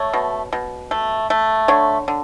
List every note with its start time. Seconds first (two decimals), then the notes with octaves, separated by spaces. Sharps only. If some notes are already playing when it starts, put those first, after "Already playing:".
Already playing: A3 C#5
0.13 B2
0.53 B2
0.91 A3
1.30 A3
1.68 D3 C#5
2.08 D3